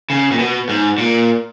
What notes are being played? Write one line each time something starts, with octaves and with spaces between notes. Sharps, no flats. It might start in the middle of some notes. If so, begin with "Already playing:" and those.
C#3
A#2
B2
G#2
A#2